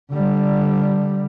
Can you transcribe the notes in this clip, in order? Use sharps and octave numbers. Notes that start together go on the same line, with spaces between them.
D3 G3